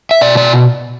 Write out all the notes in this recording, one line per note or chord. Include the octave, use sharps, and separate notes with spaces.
E5
B2 D5
D5